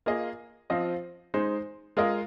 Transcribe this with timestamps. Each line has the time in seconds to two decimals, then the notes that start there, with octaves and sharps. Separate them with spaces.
0.06 A#3 F4 G#4 D#5
0.70 F3 C4 F4 C5 D#5
1.34 G#3 D#4 C5
1.97 G#3 F4 A#4 D#5